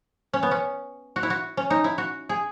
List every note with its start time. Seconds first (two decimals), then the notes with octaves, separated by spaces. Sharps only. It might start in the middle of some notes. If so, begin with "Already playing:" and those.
0.34 C#4
0.43 B3
0.51 C#4
1.16 F#4
1.23 E4
1.30 F#4
1.57 C#4
1.70 D#4
1.84 E4
1.98 F#4
2.29 G#4